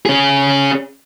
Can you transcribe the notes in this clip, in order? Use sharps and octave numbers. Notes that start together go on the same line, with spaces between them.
C#4 G#4